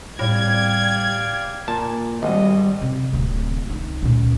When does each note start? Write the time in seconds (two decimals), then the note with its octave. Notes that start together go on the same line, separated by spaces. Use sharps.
0.19 A2 C3 G3 D5 F5 G5 G#6
1.68 A#2 A5
2.23 G#1 G3 D#5
2.82 C3
3.13 D1 C4
3.68 C2 D#4
4.03 C#2 A#2